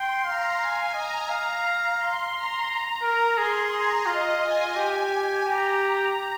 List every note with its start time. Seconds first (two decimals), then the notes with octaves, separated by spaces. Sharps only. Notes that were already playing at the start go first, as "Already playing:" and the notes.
Already playing: G5 C6
0.25 F5 A#5
0.60 G#5
0.94 D#5 A#5
1.29 F5 A#5
1.99 C6
2.34 A#5
2.68 A#5
3.03 A#4
3.37 G#4 C6
3.71 A#5
4.06 F4 D#5
4.41 G#5
4.76 G4
5.45 G4 A#5